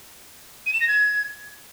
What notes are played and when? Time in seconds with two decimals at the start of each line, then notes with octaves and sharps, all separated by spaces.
0.66 D#7
0.73 E7
0.80 A#6
0.88 G#6